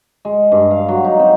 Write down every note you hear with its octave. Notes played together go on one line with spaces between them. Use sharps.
G#3
G2
F5
F#3
D#4
C4